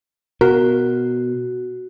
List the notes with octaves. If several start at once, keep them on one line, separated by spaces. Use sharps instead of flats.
B2 F#4 A#4